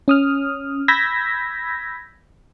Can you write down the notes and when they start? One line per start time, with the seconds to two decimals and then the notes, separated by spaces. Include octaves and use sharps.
0.08 C#4 D#6 F6
0.88 B5 E6 G6 G#6 A#6 B6